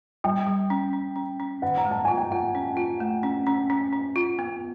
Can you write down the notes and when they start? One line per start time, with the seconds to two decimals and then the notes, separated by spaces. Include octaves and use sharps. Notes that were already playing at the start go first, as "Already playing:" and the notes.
0.24 G3 G5
0.47 G3
0.70 C#4
0.93 C#4
1.16 C#4
1.40 C#4
1.62 D#3 F#5
1.77 A#5
1.85 G#3
1.91 A5
2.05 F4 G#5
2.18 G5
2.31 F4 F#5
2.55 C#4
2.77 F4
3.00 A3
3.23 C#4
3.47 C#4
3.70 C#4
3.93 C#4
4.16 F4
4.39 B3